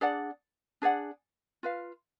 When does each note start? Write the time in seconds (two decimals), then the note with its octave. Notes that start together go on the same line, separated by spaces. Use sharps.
0.01 D4 G#4 D5 F#5
0.82 D4 G#4 D5 F#5
1.63 F4 B4 F5